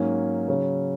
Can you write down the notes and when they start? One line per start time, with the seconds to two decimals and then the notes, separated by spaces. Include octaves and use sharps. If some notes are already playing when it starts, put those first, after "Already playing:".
Already playing: G#2 F#3 A#3 C#4
0.48 C#3 F#3 C#4